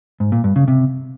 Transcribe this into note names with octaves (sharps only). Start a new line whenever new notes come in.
G#2
A#2
G2
C#3
C3